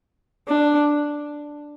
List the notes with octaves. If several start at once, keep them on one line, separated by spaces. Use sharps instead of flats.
D4